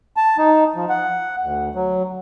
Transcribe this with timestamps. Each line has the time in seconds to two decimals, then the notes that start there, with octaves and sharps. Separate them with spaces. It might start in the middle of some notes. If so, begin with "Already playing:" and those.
0.17 A5
0.38 D#4
0.75 F3
0.89 F#5
1.43 D2
1.75 F#3